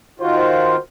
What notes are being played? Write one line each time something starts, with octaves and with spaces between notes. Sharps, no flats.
D#3 F4 F#4 C5